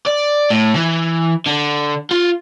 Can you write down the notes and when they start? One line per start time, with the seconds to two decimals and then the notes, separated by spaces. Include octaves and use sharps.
0.06 D5
0.50 A2
0.76 E3
1.47 D3
2.11 F4